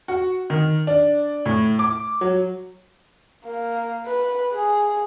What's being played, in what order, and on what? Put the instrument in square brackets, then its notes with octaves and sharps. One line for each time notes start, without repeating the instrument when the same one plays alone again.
[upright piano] F#4
D#3
D4
A2
D6
F#3
[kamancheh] A#3
B4
G#4